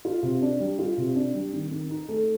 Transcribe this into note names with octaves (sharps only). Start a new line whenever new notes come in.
F4
C3
D4
G3
F4
C3
D4
G3
D#3
D#3
D#4
A3